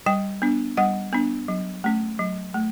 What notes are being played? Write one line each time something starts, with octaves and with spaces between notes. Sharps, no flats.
G3 G5
B3 D4
G3 F#5
B3 D4
F#3
A3 C#4
F#3
A3